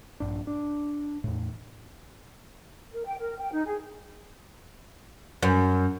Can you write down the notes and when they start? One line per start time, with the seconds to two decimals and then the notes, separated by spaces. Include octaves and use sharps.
0.20 A#1 G2 D4
0.47 D4
1.24 E2 A2
2.92 A#4
3.06 G5
3.19 A#4
3.38 G5
3.52 D#4
3.66 G#4
5.43 F#2